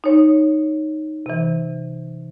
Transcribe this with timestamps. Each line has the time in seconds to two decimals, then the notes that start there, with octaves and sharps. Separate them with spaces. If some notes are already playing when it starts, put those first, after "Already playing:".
0.04 D#4 C#5
1.26 C3 E3